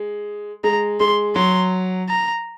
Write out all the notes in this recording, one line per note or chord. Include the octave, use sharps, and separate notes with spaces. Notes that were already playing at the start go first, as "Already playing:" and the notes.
Already playing: G#3
G#3 A#5
G#3 C6
F#3 C6
A#5